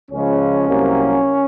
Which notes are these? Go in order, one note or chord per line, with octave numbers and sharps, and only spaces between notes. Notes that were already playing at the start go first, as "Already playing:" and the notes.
C#2 C#3 F3 G#3 C#4
C2 C3 F#3 A#3